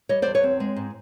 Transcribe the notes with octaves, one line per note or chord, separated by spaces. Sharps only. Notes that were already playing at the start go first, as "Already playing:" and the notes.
G3 C#5 D#5
C5 D5
E2
B4 C#5
C4
G#3
G#2